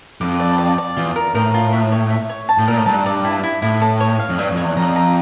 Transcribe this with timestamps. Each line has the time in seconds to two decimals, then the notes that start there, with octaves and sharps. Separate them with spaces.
0.21 F2 D6
0.40 D5
0.58 D5
0.78 D5
0.97 E2 F4
1.16 A#4
1.34 A2 A#4
1.54 F4
1.73 E5
1.92 C#5
2.10 E5
2.29 C#5
2.49 A5
2.58 A2
2.68 A#2 A#4
2.77 A2
2.86 G2 A5
3.06 D5
3.25 E4
3.43 E4
3.62 A2 E4
3.81 A4
4.00 C#5
4.19 F5
4.29 F2
4.38 G2 C#5
4.52 F2
4.57 C#5
4.64 E2
4.77 F2 A#5
4.96 A#5